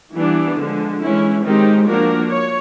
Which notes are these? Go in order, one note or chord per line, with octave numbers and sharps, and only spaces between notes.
E3 G3 B3 D4
D3 F3 G#3
E3 G#3 C#4 E4
D#3 G#3 C4 D#4 G4
F3 A#3 D4 F#4 A#4
C#5